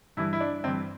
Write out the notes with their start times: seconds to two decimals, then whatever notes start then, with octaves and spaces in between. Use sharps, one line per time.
0.17 G2 E3 E4
0.33 E4
0.40 D4
0.64 G2 E3 C4